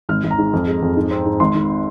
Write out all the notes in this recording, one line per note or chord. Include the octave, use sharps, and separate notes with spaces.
G#1 F6
G#1
A#5
G#2
F2
G#3
F2
G#2
C4
G#2
G#1 C6
D#3